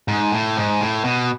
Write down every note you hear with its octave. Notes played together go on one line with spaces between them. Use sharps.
G#2
A2
G#2
A2
B2